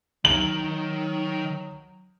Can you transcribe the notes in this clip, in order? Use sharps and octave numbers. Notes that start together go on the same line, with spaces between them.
D#3 F#3 F#7